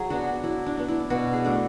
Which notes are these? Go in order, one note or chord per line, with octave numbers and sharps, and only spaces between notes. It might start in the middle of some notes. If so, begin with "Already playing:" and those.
Already playing: F#3 G#4
B3 D4 F#4
F#4
F#3 E4
D4
B3 D4
E4
B2 F#4
G#4
A3 D4